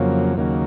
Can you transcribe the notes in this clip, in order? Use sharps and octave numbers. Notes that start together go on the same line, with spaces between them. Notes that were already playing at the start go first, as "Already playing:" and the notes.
Already playing: F2 C#3 F#3 A#3
D#2 C#3 F#3 A#3